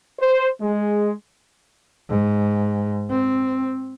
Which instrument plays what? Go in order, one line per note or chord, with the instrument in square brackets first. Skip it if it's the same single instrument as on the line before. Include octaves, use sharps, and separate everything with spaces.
[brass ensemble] C5
G#3
[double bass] G#2
C4